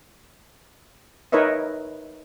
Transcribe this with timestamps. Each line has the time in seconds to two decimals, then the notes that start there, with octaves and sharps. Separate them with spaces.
1.32 D#4 A#4 B4 C#5 D#5 E5